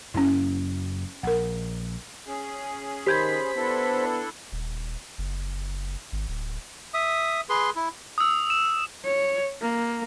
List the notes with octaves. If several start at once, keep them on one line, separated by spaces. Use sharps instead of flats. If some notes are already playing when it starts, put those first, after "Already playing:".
F#1 F#2 A#3 C#4 E4
A#1 A#4 F#5
C#4 G#4
D#3 G4 C5 B5 G6 G#6
B3 D4 E4 A4
D#1
F#1
G#1
D1
E5 D#6
G#4 B4 C6
E4
D#6 E6
E7
C#5
A#3